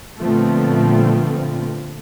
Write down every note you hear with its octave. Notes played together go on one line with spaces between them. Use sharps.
A#2 D3 F3 A3 B3 C4